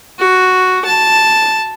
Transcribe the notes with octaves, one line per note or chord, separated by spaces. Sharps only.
F#4
A5